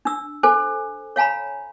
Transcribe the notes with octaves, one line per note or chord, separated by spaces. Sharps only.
D4 E6
A4 C5 G#5
C#5 F5 G#5 A#5 B5